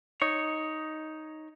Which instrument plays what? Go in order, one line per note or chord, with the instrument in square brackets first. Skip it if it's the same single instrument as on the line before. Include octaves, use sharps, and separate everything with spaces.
[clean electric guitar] D#4 C#5